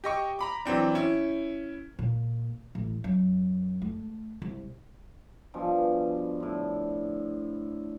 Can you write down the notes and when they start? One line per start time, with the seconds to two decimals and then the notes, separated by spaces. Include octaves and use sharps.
0.04 G4 D#5 C#6
0.39 A#5 B5 D6
0.65 E3 F#3 C4 D4
0.95 C#4 E4
1.99 A#2
2.75 A1
3.04 F#2
3.82 A3
4.42 C2
5.54 G2 B2 F3 G#5
6.40 A2 D3